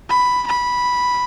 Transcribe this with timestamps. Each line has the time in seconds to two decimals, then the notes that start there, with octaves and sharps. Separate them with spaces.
0.09 B5
0.47 B5